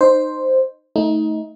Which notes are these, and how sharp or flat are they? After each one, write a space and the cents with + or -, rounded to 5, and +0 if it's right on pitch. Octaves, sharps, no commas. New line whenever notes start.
D#4 -20 C5 +0
A3 +0 D#4 +20